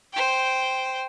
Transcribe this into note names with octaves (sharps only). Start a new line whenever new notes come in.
C5 G5